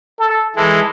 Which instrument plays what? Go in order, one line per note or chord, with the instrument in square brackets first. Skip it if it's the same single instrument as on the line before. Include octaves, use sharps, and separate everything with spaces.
[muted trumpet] A4
[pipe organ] E3 G#3 [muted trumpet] A4